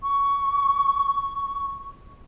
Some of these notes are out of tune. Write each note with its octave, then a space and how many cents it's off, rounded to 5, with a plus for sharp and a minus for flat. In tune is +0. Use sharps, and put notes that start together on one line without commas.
C#6 +15